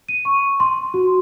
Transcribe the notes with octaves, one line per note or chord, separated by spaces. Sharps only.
D#7
C#6
C6
F#4